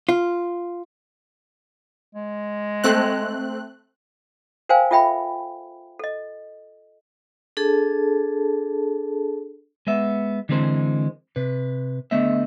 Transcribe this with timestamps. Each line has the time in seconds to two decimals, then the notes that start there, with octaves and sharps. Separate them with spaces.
0.09 F4
2.15 G#3
2.84 A3 C4 F#6
4.69 A#4 C5 F5 G5 G#5
4.91 F4 A4 E5 G5 B5
5.99 A4 D#5
7.57 D4 G#4 A4 A5
9.87 G#3 B3 E5
10.49 D3 E3 G#3 C4 A#4 C5
11.36 C3 B4
12.11 D3 A3 B3 D#5 E5